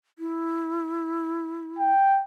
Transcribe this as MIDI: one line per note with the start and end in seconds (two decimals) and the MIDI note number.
0.19 1.90 64
1.79 2.21 79